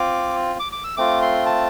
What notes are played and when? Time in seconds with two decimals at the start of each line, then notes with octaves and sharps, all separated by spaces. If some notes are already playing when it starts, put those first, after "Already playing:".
Already playing: C4 F4 D6
0.60 D6
0.72 D6
0.84 E6
0.97 A3 C4 F4 D6
1.22 C6
1.46 A5